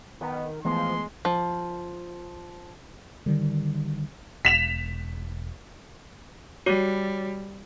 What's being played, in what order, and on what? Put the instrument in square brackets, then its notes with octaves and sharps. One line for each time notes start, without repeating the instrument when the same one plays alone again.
[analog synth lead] D#3 [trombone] B3
[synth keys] E3 A3 B3 [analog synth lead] F3 [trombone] G#3 [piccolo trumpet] C6
[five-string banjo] F3
[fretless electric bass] D3 D#3 G3
[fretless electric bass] E1 [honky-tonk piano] B6 E7 F7
[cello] G3 [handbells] F#4 C#5 D6